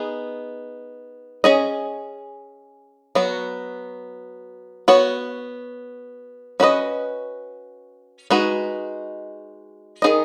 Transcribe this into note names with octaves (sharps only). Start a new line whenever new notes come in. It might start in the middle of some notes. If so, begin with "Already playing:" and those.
Already playing: B3 D#4 G#4
C#4 G#4 D#5
F#3 B3 F#4
B3 F#4 C#5
C#4 F#4 B4 D#5
G#3 D#4 F#4 B4
D#3 F#3 D#4 G#4 D#5